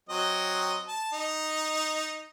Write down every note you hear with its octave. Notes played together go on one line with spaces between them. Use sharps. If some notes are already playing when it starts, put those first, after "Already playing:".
F#3 C4 D#5
A5
D#4